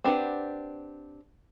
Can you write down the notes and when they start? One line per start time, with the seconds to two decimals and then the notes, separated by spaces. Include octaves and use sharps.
0.04 C4 D4 G4 B4 F#5